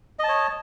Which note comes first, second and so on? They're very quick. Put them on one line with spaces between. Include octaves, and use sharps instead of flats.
D#5 A5 C#5